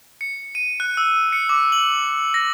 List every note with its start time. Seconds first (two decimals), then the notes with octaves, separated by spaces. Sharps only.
0.21 C#7
0.55 D#7
0.80 F#6
0.97 E6
1.33 C#7
1.49 D6
1.72 F#7
2.34 A#6